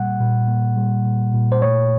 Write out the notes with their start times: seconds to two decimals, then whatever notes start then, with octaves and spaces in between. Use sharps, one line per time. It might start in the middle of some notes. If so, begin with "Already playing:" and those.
Already playing: A#2 G3 A#3 F#5
0.20 A#2
0.48 A#3
0.77 G3
1.05 A#2
1.34 A#2
1.52 C5
1.62 A3 C#5